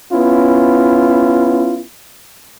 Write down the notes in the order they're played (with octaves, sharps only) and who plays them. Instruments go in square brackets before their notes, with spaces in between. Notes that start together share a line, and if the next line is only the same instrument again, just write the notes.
[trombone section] B3 C#4 E4 F4